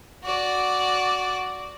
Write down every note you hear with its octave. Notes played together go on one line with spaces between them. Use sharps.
F#4 D5